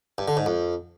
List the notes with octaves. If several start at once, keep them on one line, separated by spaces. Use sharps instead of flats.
G2
D3
G#2
F2